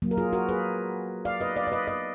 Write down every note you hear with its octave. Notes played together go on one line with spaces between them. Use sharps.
F#3 A#3
A#4
F4 G#4
F#4 A#4
G#4 B4
D5 F5
B4 D#5
D5 F5
D5
B4 D#5
B4 D#5